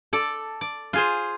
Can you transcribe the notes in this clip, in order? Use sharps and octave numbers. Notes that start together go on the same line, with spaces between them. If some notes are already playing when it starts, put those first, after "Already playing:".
A4 D5
D5
F4 G#4 C5